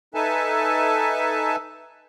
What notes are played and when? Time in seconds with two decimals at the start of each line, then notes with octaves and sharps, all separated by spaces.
0.14 D#4 A4 B4 E5 G#5 A5